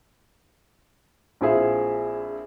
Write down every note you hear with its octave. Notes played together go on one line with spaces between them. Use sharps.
A#1 C4 E4 F4 G#4 E5